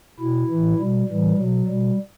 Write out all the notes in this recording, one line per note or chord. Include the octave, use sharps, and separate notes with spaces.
B2 E4
A2 E3
B2 G3
A2 E3 G3
B2 F#3
B2 G3